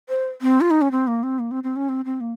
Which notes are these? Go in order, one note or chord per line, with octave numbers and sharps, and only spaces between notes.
C5
C4
F4
D#4
C#4
C4
A#3
C4
A#3
C4
C4
C#4
C4
C4
A#3